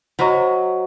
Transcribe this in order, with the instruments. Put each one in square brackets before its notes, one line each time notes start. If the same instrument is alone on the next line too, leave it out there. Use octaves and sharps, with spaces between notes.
[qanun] F#3 [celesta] F#4 C5 D#5 A#5 C#6